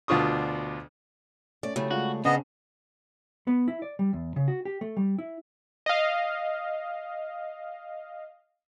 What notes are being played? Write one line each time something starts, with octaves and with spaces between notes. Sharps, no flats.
D2 B2 D4 F4 C#6 D#6
A3 C#4 D5
C#3 F#3 A3 E4 G4
G3 G#3 F4 F#4
C#3 B3 C4 D4 D#5
B3
E4
D5
G3
E2
C#3
F#4
G4
A3
G3
E4
D#5 F5